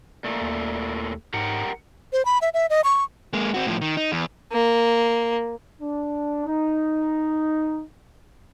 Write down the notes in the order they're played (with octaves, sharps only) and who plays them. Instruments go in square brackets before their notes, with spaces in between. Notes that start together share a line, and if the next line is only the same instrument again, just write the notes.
[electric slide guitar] A#2 A3
[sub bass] D#2
[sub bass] G#2 [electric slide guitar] G4 A#4 F#5
[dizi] C5
B5
E5
E5
D#5
C#6
[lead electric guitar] G#3 A#3
C4 F#4
A2 F3
D#3
D#4
E2
[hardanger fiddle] A#3
[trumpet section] D4
D#4